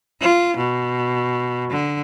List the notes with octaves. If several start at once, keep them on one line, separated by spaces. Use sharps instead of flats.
F4
B2
D3